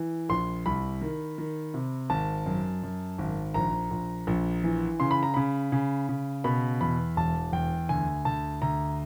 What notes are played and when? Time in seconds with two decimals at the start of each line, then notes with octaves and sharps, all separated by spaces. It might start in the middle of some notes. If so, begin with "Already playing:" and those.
Already playing: E3
0.29 A#1 C6
0.66 C2 B5
1.01 D#3
1.38 D#3
1.74 C3
2.10 G#1 A5
2.46 F#2
2.83 F#2
3.18 G#1
3.54 A#1 A#5
3.91 A#1
4.27 A#1
4.64 E3
5.00 C#3 C6
5.11 B5
5.23 A#5
5.34 C#3 B5
5.72 C#3
6.09 C#3
6.44 B2 B5
6.81 E2 B5
7.17 E1 A5
7.53 E2 G5
7.89 D2 G#5
8.25 D2 A5
8.62 D2 A#5